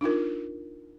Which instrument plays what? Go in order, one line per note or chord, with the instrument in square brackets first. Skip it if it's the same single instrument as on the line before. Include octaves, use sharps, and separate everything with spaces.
[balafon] D4 D#4 F4 A#4